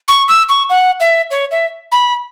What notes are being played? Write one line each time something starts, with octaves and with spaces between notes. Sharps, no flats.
C#6
E6
C#6
F#5
E5
C#5
E5
B5